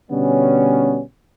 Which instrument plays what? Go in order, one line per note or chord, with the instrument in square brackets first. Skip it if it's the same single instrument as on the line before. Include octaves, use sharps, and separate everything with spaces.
[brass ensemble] B2 D3 G3 B3 C#4